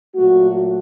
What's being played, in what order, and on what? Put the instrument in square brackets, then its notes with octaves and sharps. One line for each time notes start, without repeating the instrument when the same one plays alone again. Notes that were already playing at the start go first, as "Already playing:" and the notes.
[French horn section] A#2 F#3 A3 F#4